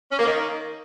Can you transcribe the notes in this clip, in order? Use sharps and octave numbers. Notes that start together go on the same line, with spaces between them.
C#4
A#3
D#3